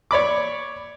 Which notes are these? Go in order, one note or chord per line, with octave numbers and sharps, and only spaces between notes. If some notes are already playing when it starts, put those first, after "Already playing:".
C#5 D5 B5 D6